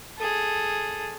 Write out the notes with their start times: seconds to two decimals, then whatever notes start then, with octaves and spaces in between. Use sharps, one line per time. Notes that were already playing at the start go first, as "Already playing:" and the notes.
0.18 G#4 A4